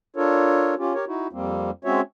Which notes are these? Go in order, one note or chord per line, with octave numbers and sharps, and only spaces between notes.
D4 F4 A4 A#4 C#5
C#4 F4 G4
G4 A#4 C#5
D#4 E4 F#4
F2 G3 A#3 C4
G#3 C4 C#4 F#4 C#5 E5